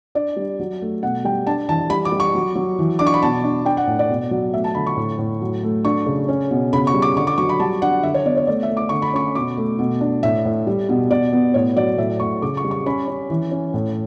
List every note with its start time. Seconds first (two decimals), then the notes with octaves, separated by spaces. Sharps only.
0.15 D4 D5
0.36 G3
0.60 F#3
0.81 A3
1.03 B2 F#5
1.25 G3 G5
1.47 D4 A5
1.69 E3 A5
1.90 G3 B5
2.05 D6
2.12 G3
2.20 C#6
2.35 F#3
2.56 F#3
2.79 E3
2.99 D4 D6
3.07 C#6
3.14 B5
3.22 B2 A5
3.44 D4
3.65 D4 G5
3.77 F#5
3.87 A2
3.99 D5
4.09 B2
4.31 F#3
4.53 A3 E5
4.64 A5
4.75 D3 B5
4.87 C#6
4.97 A2
5.18 A2
5.42 F#3
5.63 A3
5.84 D4 C#6
6.06 C#3
6.28 C#4
6.51 B2
6.73 C#3 B5
6.87 C#6
6.94 G3
7.02 D6
7.17 D3 C#6
7.27 D6
7.38 F#3 C#6
7.49 B5
7.59 G3 A5
7.82 D4 F#5
8.03 D3 E5
8.14 C#5
8.25 B3 D5
8.37 C#5
8.47 A3 D5
8.63 E5
8.70 A3
8.77 D6
8.89 D3 C#6
9.02 B5
9.13 C#4 C#6
9.35 B2 D6
9.57 A3
9.79 B2
10.01 D4
10.23 A2 E5
10.45 A2
10.67 G3
10.89 B2
11.10 B2 D5
11.33 B3
11.54 A2 C#5
11.76 F#3 D5
11.98 A2 E5
12.20 A2 C#6
12.42 C#3 D6
12.57 C#6
12.64 G3
12.71 C#6
12.86 C#4 B5
13.08 C#4
13.30 E3
13.51 C#4
13.74 A2